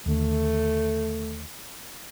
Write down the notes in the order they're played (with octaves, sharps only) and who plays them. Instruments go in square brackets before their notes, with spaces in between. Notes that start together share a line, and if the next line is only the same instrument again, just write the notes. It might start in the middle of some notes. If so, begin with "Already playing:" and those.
[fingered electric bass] D#2 D3 [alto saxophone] A3